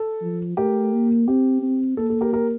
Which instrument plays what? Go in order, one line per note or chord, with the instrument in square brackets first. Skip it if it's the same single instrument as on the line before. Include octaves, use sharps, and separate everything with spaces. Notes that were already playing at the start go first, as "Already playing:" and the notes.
Already playing: [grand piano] A4
[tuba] F3
[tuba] A3 [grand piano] G4 A#4
[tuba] A#3
[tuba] C4 [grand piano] G4
[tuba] C4
[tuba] A#3 [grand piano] A4
[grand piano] A4
G4 A#4
G4 A#4